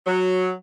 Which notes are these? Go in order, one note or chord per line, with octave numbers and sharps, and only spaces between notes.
F#3